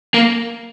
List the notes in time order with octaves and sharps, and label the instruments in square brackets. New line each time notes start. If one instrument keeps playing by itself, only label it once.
[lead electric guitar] A#3